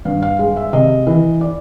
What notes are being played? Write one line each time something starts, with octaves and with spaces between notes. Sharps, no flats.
G2 F5
F5
G#3 F5
E5
C3 D#5
E3
D5